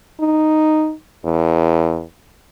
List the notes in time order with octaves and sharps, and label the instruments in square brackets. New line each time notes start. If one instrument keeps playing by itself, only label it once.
[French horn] D#4
E2